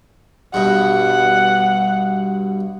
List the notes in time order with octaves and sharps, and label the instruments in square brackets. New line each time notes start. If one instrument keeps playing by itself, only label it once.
[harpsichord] G2 B2 [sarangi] F#5